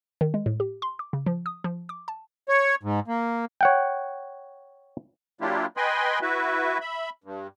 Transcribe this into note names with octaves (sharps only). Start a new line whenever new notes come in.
D#3
G#3
A2
G4
C6
D6
C#3
F3
D#6
F3
D6
A5
C#5
G#2
A#3
C#5 F#5 G5
F#3 A#3 D4 E4 F4 G4
B4 D#5 G5 G#5 B5 C6
E4 F#4 B4 E5
E5 B5
G2